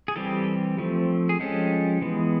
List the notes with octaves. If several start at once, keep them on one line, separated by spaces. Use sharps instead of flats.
G#4
E3 G3 C4 G4 A4
F3 A3 C4
G#4
F3 G#3 C#4 G4 A4
E3 G#3 B3